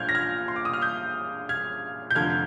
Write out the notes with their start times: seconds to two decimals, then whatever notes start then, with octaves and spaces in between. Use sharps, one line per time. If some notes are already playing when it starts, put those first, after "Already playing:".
Already playing: A#1 A#2 F3 G#3 D4 F6 G6 G#6
0.09 A#6
0.15 F6 G#6
0.48 C6
0.56 D6
0.65 D#6
0.73 F6
0.82 D#6 G6
1.49 F6 G#6
2.11 G6
2.15 F1 F2 D3 F3 F6 G#6